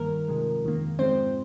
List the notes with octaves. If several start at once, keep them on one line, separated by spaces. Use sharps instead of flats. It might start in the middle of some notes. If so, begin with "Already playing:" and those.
Already playing: G2 D#3 A#3 A#4
C3 F3 G#3
F2 D#3 A#3
G#2 F3 G#3 C4 C5